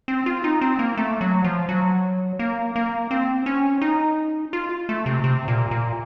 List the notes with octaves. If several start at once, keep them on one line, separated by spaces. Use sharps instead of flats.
C4
F4
D#4
C4
A#3
A3
F#3
F3
F#3
A#3
A#3
C4
C#4
D#4
F4
A3
C3
C3
A#2
A#2